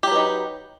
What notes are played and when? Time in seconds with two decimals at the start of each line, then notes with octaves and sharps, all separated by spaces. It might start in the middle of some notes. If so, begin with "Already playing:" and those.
0.03 G4
0.07 F#3
0.12 B4
0.16 D#4